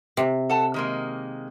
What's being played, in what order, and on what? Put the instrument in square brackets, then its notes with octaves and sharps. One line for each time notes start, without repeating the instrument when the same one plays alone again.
[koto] C3
[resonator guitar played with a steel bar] A4 F#5 A5
D#3 G#3 A#3